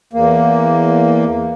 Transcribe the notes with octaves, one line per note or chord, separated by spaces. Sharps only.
E2 A#3